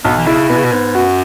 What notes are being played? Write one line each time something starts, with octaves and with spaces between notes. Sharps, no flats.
B1 B3
E3
C#3 E4
B2 B3
C#3
B2
G#2 B3
F#2 F#4